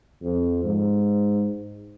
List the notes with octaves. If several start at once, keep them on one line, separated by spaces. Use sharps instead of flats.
F2
G#2